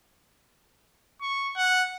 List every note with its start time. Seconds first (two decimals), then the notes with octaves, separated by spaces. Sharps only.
1.21 C#6
1.56 F#5